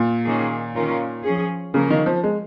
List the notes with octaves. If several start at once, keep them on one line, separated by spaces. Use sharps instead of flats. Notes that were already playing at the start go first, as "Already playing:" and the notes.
Already playing: A#2
D#3 A#3 C#4 G#4
D#3 C#4 F4 A#4
F3 C#4 G#4
C#3 F3 A#3 C#4 A#4
D#3
F3
G#3